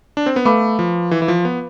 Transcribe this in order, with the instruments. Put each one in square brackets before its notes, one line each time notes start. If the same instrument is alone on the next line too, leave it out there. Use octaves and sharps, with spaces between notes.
[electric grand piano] D4
C4
B3
[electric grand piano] A3 [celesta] B4 F5 B5 D6
[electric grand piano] F3
E3
E3
F3
B3